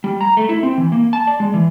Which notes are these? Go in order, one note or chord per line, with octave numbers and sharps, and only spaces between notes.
G3
A#5
A3
E4
C4
E3
A#3
A5
D5
G#3
E3